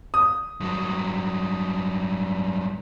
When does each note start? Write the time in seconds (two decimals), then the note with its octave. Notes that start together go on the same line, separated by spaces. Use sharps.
0.14 D#6
0.60 G2 F#3